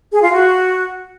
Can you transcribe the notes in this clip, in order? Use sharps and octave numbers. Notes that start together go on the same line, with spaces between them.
G#4
F4
F#4